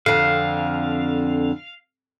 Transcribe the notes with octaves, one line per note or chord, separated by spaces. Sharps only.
F2 D3 F5